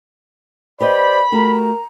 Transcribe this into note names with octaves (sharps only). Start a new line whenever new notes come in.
G4 B4 C5 D5 D#5 B5
A3 F#4 G4 A#4 A#5